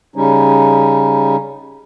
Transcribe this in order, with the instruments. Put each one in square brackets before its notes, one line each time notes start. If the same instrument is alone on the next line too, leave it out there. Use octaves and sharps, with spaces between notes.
[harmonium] C#3 G3 C#4 D#4